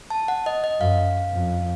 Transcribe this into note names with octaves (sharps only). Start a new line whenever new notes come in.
A5
F#5
D#5
D#5
F#2 F5
F2